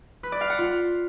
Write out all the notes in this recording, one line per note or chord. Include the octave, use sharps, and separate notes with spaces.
B4
D5
F5
F#5
F4